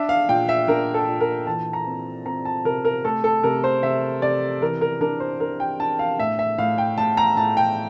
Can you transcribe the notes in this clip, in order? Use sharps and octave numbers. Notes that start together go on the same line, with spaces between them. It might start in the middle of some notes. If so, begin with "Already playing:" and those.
Already playing: D4 E5
F5
A#2 G5
E5
D4 A#4
A4
A#2
A#4
E3 A5
A#5
C4
C4 A#5
A5
C3 A#4
A#4
A3 A4
A4
C3 A#4
C5
C3 E5
C3 D5
E3 A#4
A#4
D4 A#4
C5
D4 A#4
G5
D4 A5
F5
A2 E5
E5
A2 F5
G5
A2 A5
A#5
A2 A5
G5